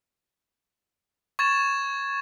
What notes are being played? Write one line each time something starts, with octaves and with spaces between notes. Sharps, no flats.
C#6 G#6 A6 E7